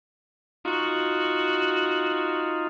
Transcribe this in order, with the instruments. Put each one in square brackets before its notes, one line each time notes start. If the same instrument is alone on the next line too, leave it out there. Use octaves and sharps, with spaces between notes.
[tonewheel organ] D#4 F4 [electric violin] F#4